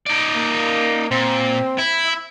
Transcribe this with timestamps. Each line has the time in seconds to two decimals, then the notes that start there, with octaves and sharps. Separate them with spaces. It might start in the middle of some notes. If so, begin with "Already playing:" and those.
0.06 D#4 D5
0.35 A#3
1.11 A#2 C4
1.78 E4
2.06 E5